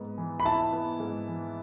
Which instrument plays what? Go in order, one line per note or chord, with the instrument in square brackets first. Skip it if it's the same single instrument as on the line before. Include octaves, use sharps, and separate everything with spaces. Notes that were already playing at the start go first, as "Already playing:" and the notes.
Already playing: [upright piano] G#2 B3
E3
[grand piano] B5
[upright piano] E4 [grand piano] A5
[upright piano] B3
G#2
E3